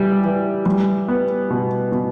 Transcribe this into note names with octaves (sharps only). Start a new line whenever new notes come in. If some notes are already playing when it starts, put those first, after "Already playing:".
Already playing: E3 G3
E3
G3
B3
B2
B2